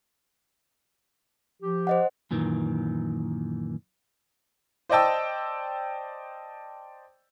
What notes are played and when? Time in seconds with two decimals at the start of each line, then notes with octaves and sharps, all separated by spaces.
1.63 F3 G4
1.87 C5 D#5 F#5
2.31 F#2 A#2 D#3 E3
4.89 C5 D5 D#5 G5 A5 E6